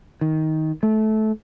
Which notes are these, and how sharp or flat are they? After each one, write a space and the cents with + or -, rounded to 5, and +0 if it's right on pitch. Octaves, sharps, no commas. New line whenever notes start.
D#3 +15
A3 -20